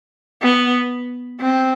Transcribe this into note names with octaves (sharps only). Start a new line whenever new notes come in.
B3
C4